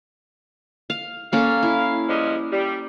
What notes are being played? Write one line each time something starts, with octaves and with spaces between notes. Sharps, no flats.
F5
A#3 C#4 A4 F5
E4
F3 G3 G#3
G3